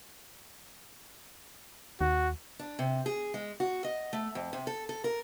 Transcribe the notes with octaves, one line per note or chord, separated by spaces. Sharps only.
D#2 F#4
D4
C3
G#4
G#3
F#4
D#5
A3
F2
C3
A4
A4
A#4